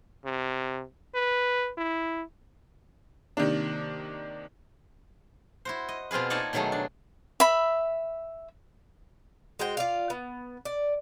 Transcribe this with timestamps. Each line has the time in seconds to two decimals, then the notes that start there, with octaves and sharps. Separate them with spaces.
0.25 C3
1.15 B4
1.78 E4
3.37 C3 D#3 A#3 D4
5.65 E4 F#4 C5
5.89 D#5
6.11 B2 C4 F4 G#4 B4
6.30 A#3 D#4 C#5 D5 G#5 A5
6.53 B2 D#3 F#3 A3 G#4
6.72 D4
7.40 E5 B5
9.59 G#3 F#4 C5 G5
9.77 F4 D5 F5
10.10 B3
10.65 D5